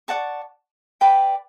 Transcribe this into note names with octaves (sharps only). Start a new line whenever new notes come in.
D5 F#5 A5 C#6
B4 D5 G5 B5